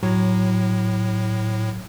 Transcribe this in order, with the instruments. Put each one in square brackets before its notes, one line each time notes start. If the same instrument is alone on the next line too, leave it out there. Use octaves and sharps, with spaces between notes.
[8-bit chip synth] A2 [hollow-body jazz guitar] F#3